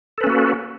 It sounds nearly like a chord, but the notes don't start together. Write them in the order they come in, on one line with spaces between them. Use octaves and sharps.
A4 B4 C#4 A#3 F#4